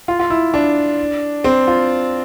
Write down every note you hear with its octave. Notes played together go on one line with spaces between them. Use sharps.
F4
F4
E4
D4
C4
F4